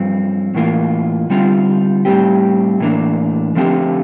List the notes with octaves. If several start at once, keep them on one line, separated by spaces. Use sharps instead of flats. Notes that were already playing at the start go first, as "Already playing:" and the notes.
Already playing: G2 F3 C4
A2 E3 A#3 F4
D3 G3 C4 F4
A2 G3 C4 G4
A2 E3 A#3 D4
D3 F3 A3 C4 G4